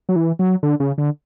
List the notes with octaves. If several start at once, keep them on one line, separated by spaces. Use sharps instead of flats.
F#3
E3
F#3
D3
C#3
D3